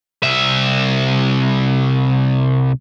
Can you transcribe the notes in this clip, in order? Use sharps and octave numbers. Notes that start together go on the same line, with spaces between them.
C2 E5